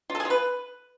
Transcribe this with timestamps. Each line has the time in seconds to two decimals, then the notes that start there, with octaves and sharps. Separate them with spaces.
0.10 F4
0.15 A4
0.20 G#4
0.25 F4
0.30 B4